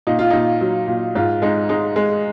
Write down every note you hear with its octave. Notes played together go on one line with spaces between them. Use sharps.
A#2 D#4
F4
A#2 D#4
F#3
A#2
G#2 F4
G#3 D#4
G#3 D#4
G#3